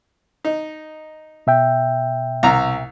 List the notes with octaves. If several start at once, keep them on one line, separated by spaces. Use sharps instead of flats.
D#4
B2 E5 G5
C2 A#5